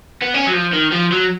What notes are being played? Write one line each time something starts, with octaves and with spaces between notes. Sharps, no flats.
B3
C#4
F#3
F3
D#3
F3
F#3